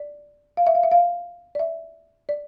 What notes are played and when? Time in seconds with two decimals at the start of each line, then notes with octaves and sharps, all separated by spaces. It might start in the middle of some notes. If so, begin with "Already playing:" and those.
Already playing: D5
0.57 F5
0.67 E5
0.75 F5
0.83 E5
0.92 F5
1.55 D5
1.59 E5
2.29 D5